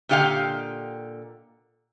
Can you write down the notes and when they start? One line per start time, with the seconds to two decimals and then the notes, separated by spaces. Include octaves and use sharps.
0.09 A#2 D3 G4 D#5 F5 G5